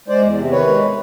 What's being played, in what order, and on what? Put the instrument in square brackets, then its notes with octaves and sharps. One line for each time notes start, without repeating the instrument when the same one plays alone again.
[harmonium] G#3 C5 D5
E2
C3
D#3 B4 C#5
G#3